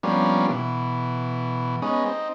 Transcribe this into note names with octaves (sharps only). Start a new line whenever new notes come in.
F3 G3 A#3 B3 C#4 D4
B2 E3
G#3 B3 C#4 D#4
C4 D#4